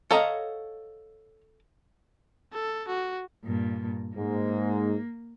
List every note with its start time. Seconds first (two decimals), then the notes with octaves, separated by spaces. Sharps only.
0.11 A4 C#5 D#5 F5 F#5 A#5
2.53 A4
2.88 F#4
3.43 G2 A#2
4.15 G#2 A#3